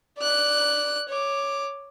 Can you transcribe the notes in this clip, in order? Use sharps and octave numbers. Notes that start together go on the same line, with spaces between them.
D5 F#6
C#5 D6